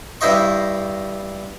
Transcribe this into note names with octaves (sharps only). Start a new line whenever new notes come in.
G2 E4 C5 D#5 C#6